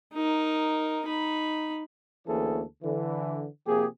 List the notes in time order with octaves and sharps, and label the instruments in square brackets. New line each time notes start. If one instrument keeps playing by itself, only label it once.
[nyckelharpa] D#4 A#4
D#4 B5
[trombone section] D2 E3 A#3 C#4 G#4 A4
D3 E3
C3 F3 A#3 G4 G#4